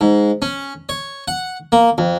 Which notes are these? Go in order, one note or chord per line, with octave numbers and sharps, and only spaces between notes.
G#2
C#4
C#5
F#5
A#3
F2